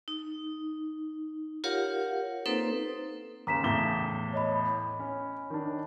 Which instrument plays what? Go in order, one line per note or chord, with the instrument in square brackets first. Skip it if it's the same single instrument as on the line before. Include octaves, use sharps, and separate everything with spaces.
[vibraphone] D#4
F4 G4 A#4 C#5 F5 F#5
A#3 C4 D#4 A4 B4 C5
[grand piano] D#2 C#3 [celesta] A#5 B6 E7
[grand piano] E2 A2 G7
[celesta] C#5 D#5 B5
[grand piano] C#4
D#3 D4